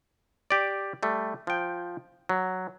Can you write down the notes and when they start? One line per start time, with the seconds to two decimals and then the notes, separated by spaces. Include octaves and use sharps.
0.50 G4 D5
1.03 G3 A3
1.47 F3 G5
2.29 F#3